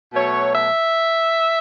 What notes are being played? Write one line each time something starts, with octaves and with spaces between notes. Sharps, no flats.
B2 F#3 A3 C#5
E5